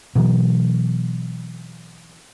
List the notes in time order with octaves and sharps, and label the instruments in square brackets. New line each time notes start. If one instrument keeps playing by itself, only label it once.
[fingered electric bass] B2 E3 F#3